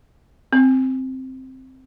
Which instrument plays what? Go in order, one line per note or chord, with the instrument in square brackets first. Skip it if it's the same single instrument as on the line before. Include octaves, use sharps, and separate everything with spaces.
[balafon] C4